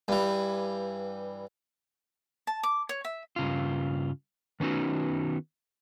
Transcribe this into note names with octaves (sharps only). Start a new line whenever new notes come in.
G2 E3
A5
D6
C#5
E5
G2 C#3 F4
D#3 B3 C#4 D#4 F#4